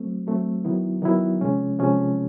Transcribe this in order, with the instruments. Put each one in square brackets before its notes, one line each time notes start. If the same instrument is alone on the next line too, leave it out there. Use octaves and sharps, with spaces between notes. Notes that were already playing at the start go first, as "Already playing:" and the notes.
Already playing: [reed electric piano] F#3 A3 C4
F#3 A3 C4
D#3 F#3 B3 E4
D#3 F#3 B3 E4
C3 F3 G#3 C#4
C3 F3 G#3 C#4